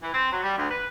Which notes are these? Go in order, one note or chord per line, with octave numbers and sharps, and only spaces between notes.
E3
C4
F#3
G3
D2
B4